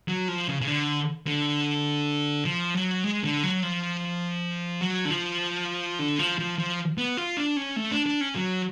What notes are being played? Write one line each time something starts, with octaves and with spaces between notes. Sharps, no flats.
F#3
F3
C#3
C#3
D3
D3
F3
F#3
G#3
D3
F#3
F3
F#3
D3
F3
D3
F3
F3
F3
B3
F4
D4
C#4
A3
D4
D4
C#4
F#3